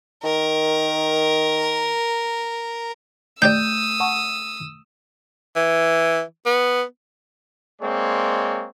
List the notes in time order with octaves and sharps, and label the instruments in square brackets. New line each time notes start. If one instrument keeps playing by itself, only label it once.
[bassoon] D#3 [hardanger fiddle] A#4
[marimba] A3 [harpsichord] D#4 G4 D5 [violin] D#6 E6 [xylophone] G6
[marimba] F#5 A5 C#6
[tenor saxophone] E3
B3
[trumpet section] G#3 A#3 C4 C#5 D5